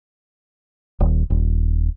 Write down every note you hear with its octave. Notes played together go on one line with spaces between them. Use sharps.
D#1
D#1